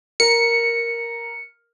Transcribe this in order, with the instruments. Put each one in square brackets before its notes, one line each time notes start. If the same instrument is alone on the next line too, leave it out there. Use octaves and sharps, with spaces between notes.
[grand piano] A#4 [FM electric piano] C#7